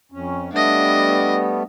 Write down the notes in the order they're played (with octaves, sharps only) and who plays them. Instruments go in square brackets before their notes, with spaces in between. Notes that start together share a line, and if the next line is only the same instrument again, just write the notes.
[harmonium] F2 C#4
[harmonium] G3 A3 B3 [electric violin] D4 D#5